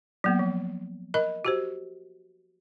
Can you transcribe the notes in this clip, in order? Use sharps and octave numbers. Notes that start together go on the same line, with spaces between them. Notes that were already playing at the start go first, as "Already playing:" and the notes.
F#3 A#3 B3
F3
A#4 D#5 B5
F#4 G4 C5